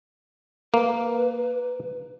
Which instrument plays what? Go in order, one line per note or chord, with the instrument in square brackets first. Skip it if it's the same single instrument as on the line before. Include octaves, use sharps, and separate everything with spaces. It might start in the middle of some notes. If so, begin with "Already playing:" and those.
[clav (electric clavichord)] A#3 [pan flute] B4